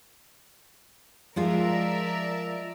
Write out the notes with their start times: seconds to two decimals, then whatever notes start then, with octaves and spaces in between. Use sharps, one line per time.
1.36 F3 G#3 F4 A#4 D5 E5